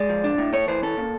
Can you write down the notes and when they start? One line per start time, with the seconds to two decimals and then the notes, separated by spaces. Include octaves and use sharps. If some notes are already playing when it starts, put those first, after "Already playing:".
Already playing: G#3 D5
0.09 F3
0.24 D4
0.38 A2
0.53 A3 C#5
0.68 E3 C5
0.83 C#4 A4
0.97 A#2